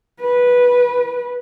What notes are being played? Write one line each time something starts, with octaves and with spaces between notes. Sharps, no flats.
B4